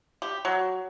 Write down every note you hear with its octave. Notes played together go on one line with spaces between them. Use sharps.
G4
F#3